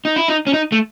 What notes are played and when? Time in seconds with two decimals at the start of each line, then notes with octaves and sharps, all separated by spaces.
0.05 D#4
0.16 E4
0.28 D#4
0.47 C#4
0.53 D#4
0.72 A3